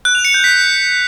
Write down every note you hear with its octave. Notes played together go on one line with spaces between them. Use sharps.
F#6
F7
C#7
G6
B6